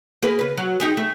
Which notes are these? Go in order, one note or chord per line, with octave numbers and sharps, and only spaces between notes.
A#3 G#4 B4
C#3 B4
F#3
D#4 G4 G#4
A3